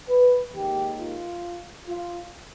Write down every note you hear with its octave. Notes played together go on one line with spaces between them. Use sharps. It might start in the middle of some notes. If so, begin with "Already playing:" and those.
B4
D#2 D#3 G#3 G4
F4
F4